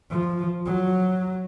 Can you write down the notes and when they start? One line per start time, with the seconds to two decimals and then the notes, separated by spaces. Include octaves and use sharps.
0.11 F3
0.66 F#3